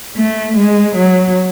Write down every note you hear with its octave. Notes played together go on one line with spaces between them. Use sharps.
A3
G#3
F#3